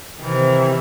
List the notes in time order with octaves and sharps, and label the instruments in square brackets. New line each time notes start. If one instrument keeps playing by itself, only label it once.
[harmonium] C3 [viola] D#3 E3